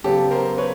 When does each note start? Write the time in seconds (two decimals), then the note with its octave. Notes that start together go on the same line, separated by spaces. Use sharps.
0.04 C#3 F#3 B3 G4 A4
0.31 A#4 C5
0.58 B4 C#5